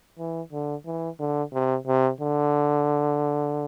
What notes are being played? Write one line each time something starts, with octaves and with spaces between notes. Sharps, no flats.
E3
D3
E3
D3
C3
C3
D3